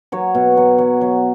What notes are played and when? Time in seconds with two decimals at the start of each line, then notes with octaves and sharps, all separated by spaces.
0.12 F#3 C#5
0.35 B2
0.57 F#3
0.78 F#3
1.01 F#3